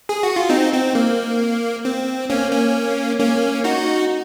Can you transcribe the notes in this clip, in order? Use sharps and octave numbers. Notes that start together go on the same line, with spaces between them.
G#4
F#4
F4
C4 D#4
C4
A#3
C4
A#3 C#4
A#3 C#4
A#3 C#4
D#4 F#4